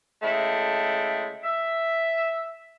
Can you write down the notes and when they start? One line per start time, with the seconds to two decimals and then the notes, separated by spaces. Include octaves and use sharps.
0.23 C#3 G#3 A3 E4 G5 A5
1.44 E5